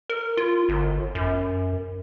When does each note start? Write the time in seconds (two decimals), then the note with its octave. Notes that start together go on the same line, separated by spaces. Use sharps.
0.10 A#4
0.37 F4
0.69 G1
1.15 F#2